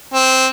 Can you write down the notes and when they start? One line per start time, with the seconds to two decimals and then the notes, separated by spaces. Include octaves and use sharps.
0.13 C4